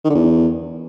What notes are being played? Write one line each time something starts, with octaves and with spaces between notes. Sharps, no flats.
D#3
D3
E2